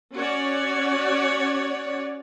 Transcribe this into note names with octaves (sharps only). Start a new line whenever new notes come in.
C#4 F#4 C#5 D5